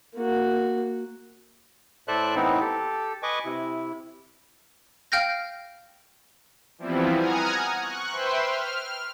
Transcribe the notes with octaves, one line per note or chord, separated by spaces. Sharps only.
A#3 F#4
A2 A4 C5 D5 E5 F#6
A2 E3 B3 C4 D#4 E4
G4 A4
B4 D#5 G#5 C#6 D6
C3 E4
F5 G5 F6 G6 A#6
E3 F3 G3 B3 C4 E4
F#5 G#5 A#5 D#6 F6 G#6
C#6 F#6
B4 C5 E5 G5 C6
F6